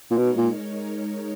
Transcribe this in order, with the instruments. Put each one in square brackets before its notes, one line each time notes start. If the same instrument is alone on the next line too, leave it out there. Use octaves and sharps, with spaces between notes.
[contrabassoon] A#2
[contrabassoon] B2 [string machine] G#3 D#4 A#4 C#5
[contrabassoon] A#2